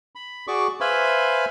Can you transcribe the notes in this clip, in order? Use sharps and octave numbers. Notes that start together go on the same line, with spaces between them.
B5
F#4 G#4 D5 C#6 D6
B4 C5 E5 F5 G#5 B5